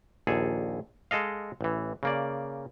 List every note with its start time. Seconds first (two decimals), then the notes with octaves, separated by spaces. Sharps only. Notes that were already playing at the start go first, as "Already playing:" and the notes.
0.27 A#1 D#2 G#4 A4
1.11 G#3 A4 D#5 F5
1.61 A1 E3
2.03 C#3 A#3 D5